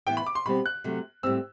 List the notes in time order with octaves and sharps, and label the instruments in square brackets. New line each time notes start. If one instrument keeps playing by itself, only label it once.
[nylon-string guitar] A2 E3 B3 E4 [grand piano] G5
[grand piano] B5
D6
C6
[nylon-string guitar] B2 G3 C4 [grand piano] B5
[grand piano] F#6
[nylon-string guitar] C3 F#3 A3
[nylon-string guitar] A2 G3 C4 [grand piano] E6